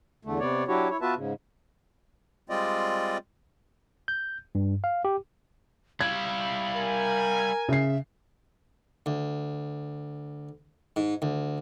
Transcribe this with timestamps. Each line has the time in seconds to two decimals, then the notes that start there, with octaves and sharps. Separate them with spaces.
0.25 E2 D3 A3
0.39 C3 B3 C#5 D5
0.68 F#3 D4 E4 F#4 G4 C#5
0.90 E4 C#5
1.01 B3 F4 F#4 B4 E5 A5
1.16 G#2 C#3
2.49 G3 G#3 C4 F4 D5 D#5
4.08 G6
4.55 G2
4.84 F5
5.05 G4
6.01 G3 E4 F5 G#6
6.74 A#4 G#5
7.69 C#3 E5 C7
9.06 D2
10.96 G#2
11.22 D2